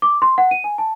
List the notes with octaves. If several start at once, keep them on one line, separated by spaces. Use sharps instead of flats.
D6
C6
F#5
D#7
G#5
A5